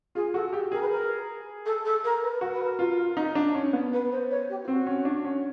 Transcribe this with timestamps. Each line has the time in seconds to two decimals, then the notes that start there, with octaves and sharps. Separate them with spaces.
0.15 F4 G#4
0.34 F#4 A4
0.53 G4 G#4
0.72 G#4 A#4
0.81 B4
0.89 A#4
1.65 A4
1.85 A4
2.04 A#4
2.22 B4
2.41 F#4 A#4
2.52 B4
2.63 A#4
2.79 F4
3.17 D#4
3.35 D4
3.54 C#4
3.73 B3
3.92 B4
4.11 C5
4.30 C#5
4.49 G4
4.63 F4
4.68 C4 F#4
4.87 C#4
5.05 D4
5.24 C#4